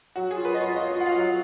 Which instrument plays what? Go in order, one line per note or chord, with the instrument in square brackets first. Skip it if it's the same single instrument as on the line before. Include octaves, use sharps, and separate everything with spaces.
[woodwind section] F#3 [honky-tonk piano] F#4
[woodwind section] F4 [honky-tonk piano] G#4
[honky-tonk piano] B4
[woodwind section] F4 [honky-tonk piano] D#5
[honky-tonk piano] C#5
[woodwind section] F4 [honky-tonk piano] D#5
[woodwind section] F4 [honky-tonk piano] F#5
[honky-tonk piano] F5
[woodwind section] F#3